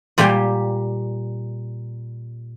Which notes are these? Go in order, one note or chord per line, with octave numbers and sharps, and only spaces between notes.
A#2 G3 A#3 G4 G5 G#5